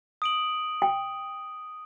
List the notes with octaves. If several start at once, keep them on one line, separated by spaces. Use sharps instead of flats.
D#6 D7 F#7
G5